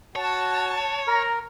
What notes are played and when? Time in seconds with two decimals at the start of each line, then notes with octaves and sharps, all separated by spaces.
0.16 F#4 C#5 A5
1.07 A#4 A#5